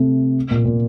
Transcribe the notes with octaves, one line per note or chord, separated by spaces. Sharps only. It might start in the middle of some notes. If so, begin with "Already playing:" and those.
Already playing: C3 A3
A#2
A#2